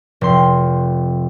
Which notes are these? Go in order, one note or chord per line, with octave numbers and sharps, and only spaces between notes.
F1 C6